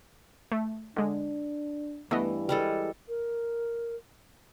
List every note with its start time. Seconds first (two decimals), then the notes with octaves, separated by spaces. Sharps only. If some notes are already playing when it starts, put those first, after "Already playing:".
0.52 A3
0.96 D3 G#3 D4
2.11 G2 E3 A3 B3 D#5
2.49 G3 G#3 A4
3.09 A#4